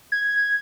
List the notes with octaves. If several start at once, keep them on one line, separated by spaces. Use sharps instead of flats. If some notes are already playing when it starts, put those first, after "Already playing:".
G#6